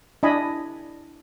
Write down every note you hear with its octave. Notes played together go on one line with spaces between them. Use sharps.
D4 E4 D#5 G#5 B5